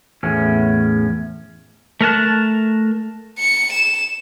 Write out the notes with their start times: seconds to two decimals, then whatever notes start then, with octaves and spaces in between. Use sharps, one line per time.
0.23 E2 A2 C#4
2.01 A3 A#4 A5 F#6
3.39 C#7
3.72 E7